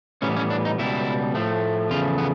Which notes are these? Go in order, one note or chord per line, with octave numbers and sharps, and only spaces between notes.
A2 E3 G3 B3 C#4
C#4
D4
D#4
C#2 B2 G3 E4
A2 F3 A3
E2 C#3 F3 A3 F4
B3